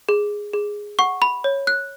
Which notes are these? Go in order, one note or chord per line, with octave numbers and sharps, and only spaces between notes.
G#4
G#4
F#5 C#6
B5
C#5
F#6